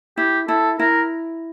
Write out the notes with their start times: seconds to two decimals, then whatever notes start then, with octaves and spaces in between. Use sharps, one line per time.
0.18 E4 G4
0.48 E4 A4
0.79 E4 A#4